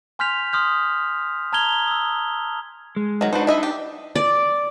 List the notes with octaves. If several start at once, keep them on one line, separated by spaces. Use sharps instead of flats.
G#5 C6 F6 G6 B6 F7
C6 D#6 F6 G6
A5 A#5 F6 G#6 F7 G7
D#6 E6
G#3
D#3 F#3
D4 D#4 F#4 B4 C5
E4 D#5 E5
G4
D5